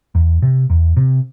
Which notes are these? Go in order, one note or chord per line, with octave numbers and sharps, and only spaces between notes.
E2
C3
E2
C3